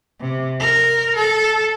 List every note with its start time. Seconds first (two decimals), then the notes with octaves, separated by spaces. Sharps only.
0.21 C3
0.60 A#4
1.16 A4